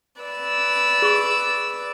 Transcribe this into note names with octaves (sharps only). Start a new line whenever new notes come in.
B4 D5 E6
G#4 C#6